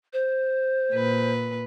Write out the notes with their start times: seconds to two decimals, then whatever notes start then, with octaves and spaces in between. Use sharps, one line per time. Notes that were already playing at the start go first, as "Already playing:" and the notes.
0.13 C5
0.92 A#2 B4